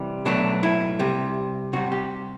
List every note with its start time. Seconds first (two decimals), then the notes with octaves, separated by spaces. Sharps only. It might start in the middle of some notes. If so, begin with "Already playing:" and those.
Already playing: C3 E3 G3
0.25 B2 F#3 A3 D4
0.63 E4
0.99 C3 G3
1.73 C3 G3 F#4
1.92 G4